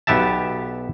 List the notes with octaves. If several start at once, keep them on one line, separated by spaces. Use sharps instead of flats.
B1 B3 G4 E5 A5